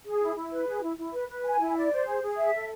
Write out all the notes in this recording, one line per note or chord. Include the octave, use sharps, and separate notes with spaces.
G#4
E4
E4
B4
G#4
E4
E4
B4
B4
G#5
E4
D5
C5
G#4
G#4
E5
A4